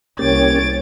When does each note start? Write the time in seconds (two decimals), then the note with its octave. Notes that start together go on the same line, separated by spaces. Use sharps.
0.19 C2 A#3 C#4 G4 C#5 A6 D7